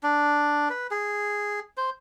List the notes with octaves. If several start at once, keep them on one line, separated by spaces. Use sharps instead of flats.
D4
B4
G#4
C5